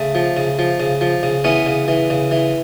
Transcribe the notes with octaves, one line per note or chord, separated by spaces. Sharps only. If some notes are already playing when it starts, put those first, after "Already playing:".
Already playing: C#3 A3
F3
C#3
F3
C#3
F3
C#3
E3 B3 C#4
C#3
E3
C#3
E3